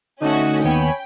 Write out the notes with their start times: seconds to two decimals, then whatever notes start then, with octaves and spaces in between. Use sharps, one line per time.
0.21 D3 A3 C#4 D#4 F#4
0.64 D#2 B3 C#5 G5 G#5 B5